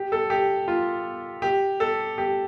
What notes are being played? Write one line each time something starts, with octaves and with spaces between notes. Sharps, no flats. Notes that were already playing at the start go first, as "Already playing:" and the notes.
Already playing: G4
A4
G4
F4
G4
A4
G4